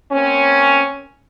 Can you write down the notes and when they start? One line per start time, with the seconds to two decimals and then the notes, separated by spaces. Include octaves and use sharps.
0.12 A#3 C4 C#4